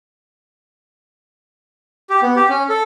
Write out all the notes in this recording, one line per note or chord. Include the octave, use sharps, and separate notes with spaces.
G4
B3
G4
C#4
A4